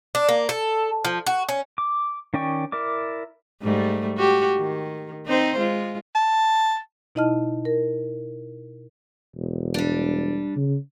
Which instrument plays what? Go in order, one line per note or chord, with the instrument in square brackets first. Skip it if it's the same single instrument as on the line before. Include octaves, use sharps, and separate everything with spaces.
[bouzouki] D4
A#3
A4
F3
F#4
C#4
[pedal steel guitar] D6
D#3 C#4 D5 G5 C#6
E4 A#4 D5 D6
[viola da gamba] G#2 G3 A3
F#4 G4
D#3
C4 D#4 C5
G#3 F4
[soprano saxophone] A5
[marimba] B2 D#4 E4 D#5 A5 F6
A#4
[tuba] E1
[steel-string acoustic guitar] G3 D4
[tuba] C#3